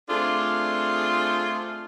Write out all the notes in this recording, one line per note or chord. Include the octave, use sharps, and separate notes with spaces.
A3 C4 D4 F4 G#4 A4